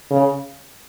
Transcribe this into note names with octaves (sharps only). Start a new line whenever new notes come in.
C#3